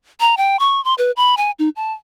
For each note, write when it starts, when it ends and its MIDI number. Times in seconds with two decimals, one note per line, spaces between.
0.20 0.35 82
0.37 0.59 79
0.59 0.83 85
0.85 0.94 84
0.98 1.11 71
1.17 1.35 83
1.37 1.51 80
1.59 1.69 63
1.76 1.93 81